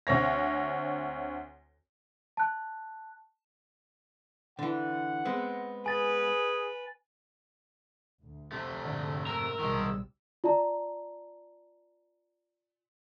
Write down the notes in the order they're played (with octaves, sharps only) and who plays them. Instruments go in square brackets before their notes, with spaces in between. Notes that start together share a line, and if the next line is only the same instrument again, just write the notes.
[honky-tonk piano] D2 C4 C#5 A#6
[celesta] A5 F#6
[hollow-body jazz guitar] D3 E3 [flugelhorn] F#5
[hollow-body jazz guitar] G#3 B3 C4
[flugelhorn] G#4 [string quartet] B4 [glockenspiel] G#5 A6
[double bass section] D2
[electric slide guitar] C3 A3
[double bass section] G#2 [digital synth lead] D3
[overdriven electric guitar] A#4 [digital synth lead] E6
[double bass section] B1 C3 G3 [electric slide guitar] D#3 G#3
[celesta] F4 D5 A5 A#5